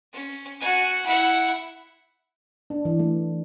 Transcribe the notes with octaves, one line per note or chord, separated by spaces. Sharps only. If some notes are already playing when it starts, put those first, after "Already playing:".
C#4
F#4 G#5
E4 F#5
D4
E3
A3